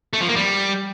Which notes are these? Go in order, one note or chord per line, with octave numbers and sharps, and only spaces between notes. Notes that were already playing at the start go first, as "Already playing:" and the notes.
A3
F3
A#3
G3